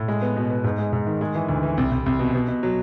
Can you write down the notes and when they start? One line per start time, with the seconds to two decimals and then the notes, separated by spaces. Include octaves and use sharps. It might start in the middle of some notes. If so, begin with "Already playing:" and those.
Already playing: A2
0.08 G#3
0.22 B3
0.36 B2
0.50 B3
0.64 G#2
0.78 G#3
0.93 G#2
1.07 D#3
1.21 G#3
1.35 E3
1.49 D2
1.63 E3
1.77 C2
1.91 C2
2.06 C2
2.19 B2
2.35 B2
2.48 B2
2.63 F#3